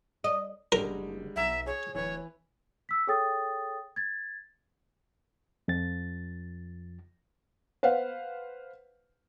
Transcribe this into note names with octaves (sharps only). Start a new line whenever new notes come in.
D#5
F#1 D3 G3 G#3 A#4
B1 E5 F#5 A#5
G#4 C#5
D1 E3 B4 C#5
E6 B6
G#4 A4 C#5 G5 D#6 A6
G#6 A6
F2 F3 A6
B4 C5 F5 F#5